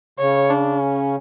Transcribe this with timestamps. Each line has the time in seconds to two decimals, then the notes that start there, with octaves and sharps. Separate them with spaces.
0.19 C#3 C#5
0.50 D4
0.81 C#4